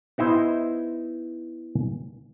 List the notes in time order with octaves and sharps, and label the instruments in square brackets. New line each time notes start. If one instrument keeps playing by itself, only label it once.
[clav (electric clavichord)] B3 D#4 E4 C5